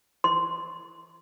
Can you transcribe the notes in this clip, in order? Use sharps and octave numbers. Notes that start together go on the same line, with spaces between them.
C6